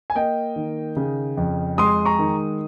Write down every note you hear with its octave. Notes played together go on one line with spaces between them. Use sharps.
G#5
A#3 D#5 G5
D#3
C#3
F2
G#3 C6 D#6
A#5 C#6
D#3